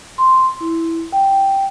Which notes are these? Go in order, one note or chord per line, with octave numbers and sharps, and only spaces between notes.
C6
E4
G5